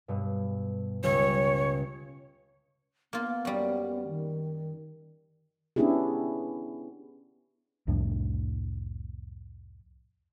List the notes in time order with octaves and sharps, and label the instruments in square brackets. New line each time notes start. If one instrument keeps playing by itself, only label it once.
[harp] G2 B2
[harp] C#2 G3 [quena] C#5
[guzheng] A#3 F4 [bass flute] B3
[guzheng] F#2 G3
[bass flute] D#3
[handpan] B3 C#4 D4 E4 G4 G#4
[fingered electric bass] C2 F2 A2 D4